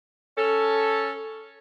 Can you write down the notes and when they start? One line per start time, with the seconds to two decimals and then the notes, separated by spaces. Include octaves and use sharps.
0.38 C#4 A4